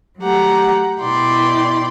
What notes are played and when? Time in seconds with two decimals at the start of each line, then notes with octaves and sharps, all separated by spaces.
0.20 F#3 A3 G4 F#5 A#5
1.02 B2 E4 D5 G5 C6